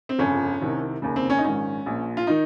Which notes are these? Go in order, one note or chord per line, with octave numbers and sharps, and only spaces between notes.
C4
G1 F2 C#3 C#4
C2 C3 D#3
F1 D#2 C#3
C4
C#4
D#4
A#1 G#2 D#3 C#4
A#1 A#2
F4
D#3 D#4